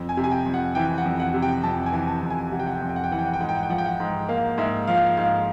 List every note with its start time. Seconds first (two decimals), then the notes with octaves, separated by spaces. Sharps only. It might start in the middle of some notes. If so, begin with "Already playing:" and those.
Already playing: F2
0.09 G#5
0.17 C3
0.24 G#5
0.31 G5
0.46 F2
0.54 F#5
0.75 E3 G5
0.98 F#5
1.05 F2
1.20 F#5
1.34 C3
1.42 G5
1.63 F2 A5
1.86 G#5
1.93 E3
2.08 A5
2.23 F2
2.30 G#5
2.52 C3 F#5
2.60 G5
2.67 F#5
2.75 G5
2.81 F2 F#5
2.89 G5
2.96 F#5
3.04 G5
3.11 E3 F#5
3.19 G5
3.26 F#5
3.33 G5
3.40 G#2 F#5
3.49 G5
3.56 F#5
3.63 G5
3.70 F3 F#5
3.78 G5
3.86 F#5
4.00 G#2
4.28 A#3 F5
4.58 G#2 E5
4.87 F3 F5
5.17 G#2 F5